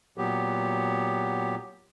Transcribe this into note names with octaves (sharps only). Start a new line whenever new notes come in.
A#2 F#3 B3 G4